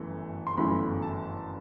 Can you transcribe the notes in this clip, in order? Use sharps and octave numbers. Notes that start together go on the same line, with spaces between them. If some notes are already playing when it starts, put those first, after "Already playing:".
Already playing: G1 F#2 E3 A3
C6
G1 F#2 E3 A3 E4 B5
A5